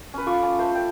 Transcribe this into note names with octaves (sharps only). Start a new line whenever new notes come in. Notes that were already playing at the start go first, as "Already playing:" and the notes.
C#4 B4
F4 A4 C#6 D6
C#4
A3 C5
A4 G5